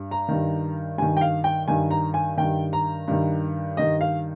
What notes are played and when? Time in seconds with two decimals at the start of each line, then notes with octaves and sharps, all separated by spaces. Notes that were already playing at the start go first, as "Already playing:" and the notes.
Already playing: G2
0.11 A#5
0.28 G2 D#3
0.98 G2 D#3 G#5
1.17 G5
1.21 F5
1.44 G5
1.68 G2 D#3 G#5
1.91 A#5
2.14 G#5
2.37 G2 D#3 G5
2.73 A#5
3.08 G2 D#3
3.77 G2 D#3 D#5
4.01 F5